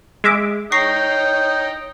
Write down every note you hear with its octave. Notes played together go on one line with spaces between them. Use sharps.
G#3 E5 D6
D#4 C#5 D#5 G5 C#6 A#6 C7